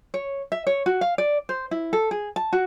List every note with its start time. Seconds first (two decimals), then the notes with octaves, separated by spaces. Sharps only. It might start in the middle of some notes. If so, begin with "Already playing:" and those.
0.14 C#5
0.52 E5
0.67 C#5
0.86 F#4
1.01 F5
1.18 D5
1.49 C5
1.71 E4
1.93 A4
2.11 G#4
2.36 A5
2.53 F#4